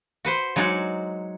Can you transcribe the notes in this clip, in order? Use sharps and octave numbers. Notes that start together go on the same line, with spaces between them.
F#4 B4 C5
F#3 G#3 D#4 F#4 D5